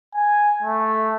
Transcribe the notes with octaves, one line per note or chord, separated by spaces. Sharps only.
G#5
A3